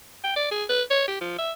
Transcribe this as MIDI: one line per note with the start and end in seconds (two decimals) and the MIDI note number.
0.24 0.34 79
0.36 0.46 74
0.51 0.64 68
0.70 0.82 71
0.91 1.04 73
1.08 1.17 67
1.21 1.38 53
1.38 1.52 76